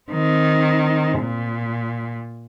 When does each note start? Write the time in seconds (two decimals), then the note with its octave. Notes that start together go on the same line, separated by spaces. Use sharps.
0.11 D#3 C4
1.19 A#2